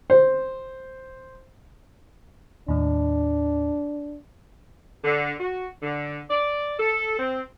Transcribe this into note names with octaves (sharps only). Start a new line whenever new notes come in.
C5
D#2 A2 D4
D3
F#4
D3
D5
A4
C4